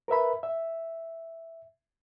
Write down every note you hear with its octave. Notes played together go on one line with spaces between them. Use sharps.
A#4 B4 E5 B5
E5